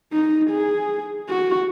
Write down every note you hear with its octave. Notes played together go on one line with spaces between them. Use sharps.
D#4
G#4
F#4